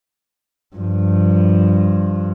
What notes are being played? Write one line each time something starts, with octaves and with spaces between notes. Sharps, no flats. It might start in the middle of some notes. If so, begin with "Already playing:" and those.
G2 F3